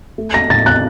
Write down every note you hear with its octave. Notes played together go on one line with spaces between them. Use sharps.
A3
A#6
A2 A6
F#6